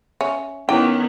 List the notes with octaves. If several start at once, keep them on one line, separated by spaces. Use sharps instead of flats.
C#4 E5
D#3 B3 C#4 E4 C#5 G5